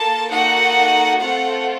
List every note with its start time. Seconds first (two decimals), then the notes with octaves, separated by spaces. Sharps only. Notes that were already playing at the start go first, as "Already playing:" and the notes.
Already playing: A#3 F4 A4 A5
0.29 A#3 D#4 F#4 A4 F#5
1.21 A3 C4 F4 A4 F#5